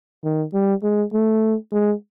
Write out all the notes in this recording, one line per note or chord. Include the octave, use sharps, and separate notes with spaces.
D#3
G3
G#3
A3
G#3